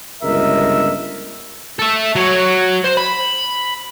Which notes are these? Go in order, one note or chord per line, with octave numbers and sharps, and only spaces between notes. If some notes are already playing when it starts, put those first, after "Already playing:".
G1 C#2 A#4 D#5 E5
A4 E5
F#3 C#5
C5
B5